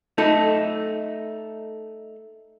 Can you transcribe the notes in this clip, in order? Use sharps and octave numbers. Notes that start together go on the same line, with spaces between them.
A3 D#4 A4